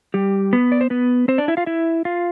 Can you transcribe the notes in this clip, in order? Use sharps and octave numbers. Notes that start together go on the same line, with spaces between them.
G3 G4
B3 B4
D5
C5
B3 B4
C4 C5
D4 D5
E4 E5
F4 F5
E4 E5
F4 F5